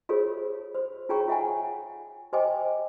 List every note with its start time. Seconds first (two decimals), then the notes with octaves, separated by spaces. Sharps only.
0.09 F4 G4 G#4 A#4 C5 C#5
0.75 C5
1.09 F4 G#4 C#5 G5 A#5 C#6
1.28 F4 E5 F#5 G#5
2.33 G4 C5 D#5 G5 G#5 D6